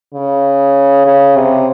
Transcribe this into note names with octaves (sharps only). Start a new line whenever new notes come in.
C#3
C#3
C3